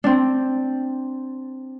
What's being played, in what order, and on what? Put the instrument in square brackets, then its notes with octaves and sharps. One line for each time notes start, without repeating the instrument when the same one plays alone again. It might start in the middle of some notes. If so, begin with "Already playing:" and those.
[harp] C4 D4